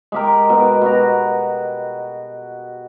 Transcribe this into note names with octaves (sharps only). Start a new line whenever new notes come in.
G#3 G4 A#4
B2
B2 F#4 A#5